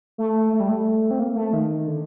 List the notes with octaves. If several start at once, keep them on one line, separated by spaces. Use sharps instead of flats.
A3
A3
G3
A3
C4
A#3
A3
D#3
D3